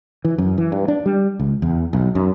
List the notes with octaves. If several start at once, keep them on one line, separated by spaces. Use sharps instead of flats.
E3
F#2
E3
G2
D4
G3
C#2
E2
B1
F#2